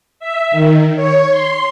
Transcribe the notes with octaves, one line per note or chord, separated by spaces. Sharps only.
E5
D#3
C#5
C6